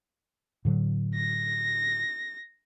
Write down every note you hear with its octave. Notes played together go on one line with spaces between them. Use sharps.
A2 D3 F#3
A#6